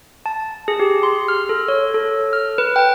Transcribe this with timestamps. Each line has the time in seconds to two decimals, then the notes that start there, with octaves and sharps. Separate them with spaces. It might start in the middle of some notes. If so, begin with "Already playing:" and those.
0.26 A5
0.68 G#4
0.80 G4
1.03 C6
1.28 F6
1.49 A4
1.68 C#5
1.94 A4
2.33 F6
2.58 B4
2.76 G5